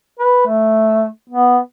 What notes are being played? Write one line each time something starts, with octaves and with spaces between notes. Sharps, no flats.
B4
A3
B3